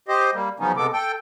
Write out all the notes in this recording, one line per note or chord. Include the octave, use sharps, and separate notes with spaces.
G4 C5 D#5
G3 A#3
C#3 F3 F#3 B3 C#4 D#4
C3 G#3 B3 A4 D6
A4 G5